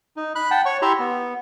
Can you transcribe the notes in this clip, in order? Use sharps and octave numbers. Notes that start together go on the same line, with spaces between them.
D#4
B5 F#6
F#5 G5 A5
C#5 C#6
E4 G4 E5 A#5 C6
B3